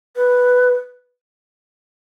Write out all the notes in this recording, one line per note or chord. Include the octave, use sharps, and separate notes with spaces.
B4